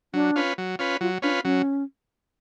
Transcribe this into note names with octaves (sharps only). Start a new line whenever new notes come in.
F#3 D4
C#4 F4 B4
F#3
C#4 F4 B4
F#3 F4
C#4 D4 F4 B4
F#3 C#4